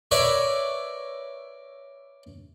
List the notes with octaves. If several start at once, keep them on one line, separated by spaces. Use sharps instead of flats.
A#4 B4 C#5 D5 E5